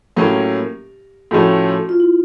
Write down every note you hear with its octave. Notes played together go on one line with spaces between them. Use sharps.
A2 F#3 A#3 C#4 G4
A2 F3 A3 C#4 F#4
F4
E4